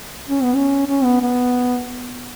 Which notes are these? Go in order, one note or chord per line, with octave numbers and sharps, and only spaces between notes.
C#4
B3
C#4
C#4
B3
B3